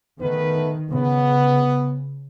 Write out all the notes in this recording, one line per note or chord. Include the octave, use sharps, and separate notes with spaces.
D#3 A3 B3 B4
C#3 B3